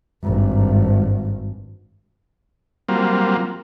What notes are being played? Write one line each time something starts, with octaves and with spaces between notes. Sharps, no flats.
G#1 G2
F#3 G3 A#3 C4 F4